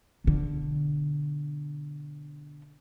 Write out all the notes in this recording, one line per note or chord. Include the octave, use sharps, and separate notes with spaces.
B2 D3